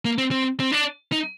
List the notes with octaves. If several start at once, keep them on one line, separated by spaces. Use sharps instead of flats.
A#3
C4
C4
C4
D4
D#4